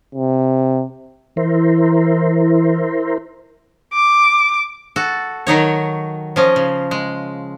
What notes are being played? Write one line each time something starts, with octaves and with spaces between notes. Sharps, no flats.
C3
E3 E4 A#4 C5
D6
F#4 A4
D#3 F#3 D#4 C#5
F3 C#4 D#5
C#3
G#3